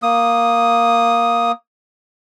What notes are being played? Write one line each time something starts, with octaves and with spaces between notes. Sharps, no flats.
A#3 D#6